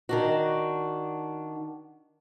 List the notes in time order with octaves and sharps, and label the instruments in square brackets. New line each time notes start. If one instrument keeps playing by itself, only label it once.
[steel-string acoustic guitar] D#3 D4 F#4